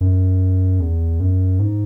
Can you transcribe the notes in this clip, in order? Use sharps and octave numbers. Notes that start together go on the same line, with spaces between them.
F#2
E2
F#2
G#2